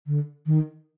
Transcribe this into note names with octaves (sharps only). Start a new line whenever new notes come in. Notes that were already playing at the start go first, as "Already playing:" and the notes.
D3
D#3